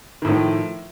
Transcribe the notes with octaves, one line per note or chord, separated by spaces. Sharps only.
A2 D#3 F3